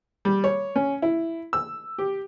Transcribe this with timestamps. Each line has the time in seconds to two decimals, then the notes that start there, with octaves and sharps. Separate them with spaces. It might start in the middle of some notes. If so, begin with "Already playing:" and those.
0.25 G3
0.44 C#5
0.76 C#4
1.02 E4
1.53 E6
1.98 G4